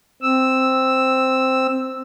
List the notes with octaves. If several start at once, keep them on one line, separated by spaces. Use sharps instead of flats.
C4 E6